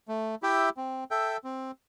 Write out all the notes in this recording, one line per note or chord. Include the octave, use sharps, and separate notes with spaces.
A3
E4 G4 E5 G5
C4
A4 E5 G5
C4